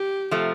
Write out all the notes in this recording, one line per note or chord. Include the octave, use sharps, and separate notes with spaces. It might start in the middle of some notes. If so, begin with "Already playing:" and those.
Already playing: G4
C3 F3 A3